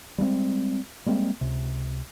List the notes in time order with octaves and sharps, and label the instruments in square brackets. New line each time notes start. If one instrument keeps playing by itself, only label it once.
[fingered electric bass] G3 G#3 A#3 C4
G3 G#3 A#3 C4
C#2 C3